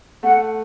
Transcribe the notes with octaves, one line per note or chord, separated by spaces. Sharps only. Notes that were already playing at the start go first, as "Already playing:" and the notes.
A3 F#5